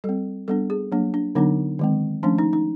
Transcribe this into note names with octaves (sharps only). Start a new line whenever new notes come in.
G3 C4 A4
G3 B3 D4 A4
G#4
F#3 A#3 D4
D4
D3 F#3 B3 D4 D#4
D#3 G#3 C4
F3 A3 C#4 D4
D#4
D#4